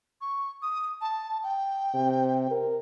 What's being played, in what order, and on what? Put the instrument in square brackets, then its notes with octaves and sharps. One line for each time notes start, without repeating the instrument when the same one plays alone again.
[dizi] C#6
D#6
A5
G5
[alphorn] C3
A#4